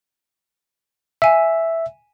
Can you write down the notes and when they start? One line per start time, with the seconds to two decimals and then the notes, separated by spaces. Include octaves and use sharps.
1.22 E5 F5 G#5